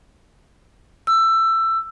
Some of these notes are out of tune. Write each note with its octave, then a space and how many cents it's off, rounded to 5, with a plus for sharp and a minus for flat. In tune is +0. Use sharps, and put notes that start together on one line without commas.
E6 +15